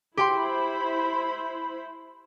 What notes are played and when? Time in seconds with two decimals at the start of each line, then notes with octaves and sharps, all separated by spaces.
0.17 E4 G4 C5 G5 B5 C6